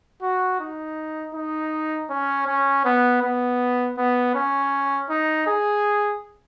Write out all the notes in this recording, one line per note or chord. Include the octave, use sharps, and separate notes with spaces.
F#4
D#4
D#4
C#4
C#4
B3
B3
B3
C#4
D#4
G#4